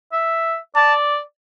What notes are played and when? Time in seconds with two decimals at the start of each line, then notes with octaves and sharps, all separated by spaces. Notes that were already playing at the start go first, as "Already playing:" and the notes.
0.13 E5
0.75 D5 A5